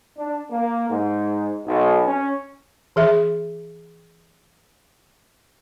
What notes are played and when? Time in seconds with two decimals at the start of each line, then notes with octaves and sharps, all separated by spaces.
0.17 D4
0.50 A#3
0.89 G#2
1.66 B1
2.06 C#4
2.96 E3 G#4 E5